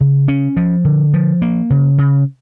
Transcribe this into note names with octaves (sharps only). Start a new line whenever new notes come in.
C#3
C#4
F3
D3
F3
A#3
C#3
C#3